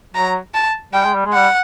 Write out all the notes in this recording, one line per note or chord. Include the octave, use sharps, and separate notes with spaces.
F#3 A#5
A5
G3 G5
G#3
G3
G#3
G3 F#5